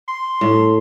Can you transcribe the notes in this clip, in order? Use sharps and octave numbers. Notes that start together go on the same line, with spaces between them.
C6
A2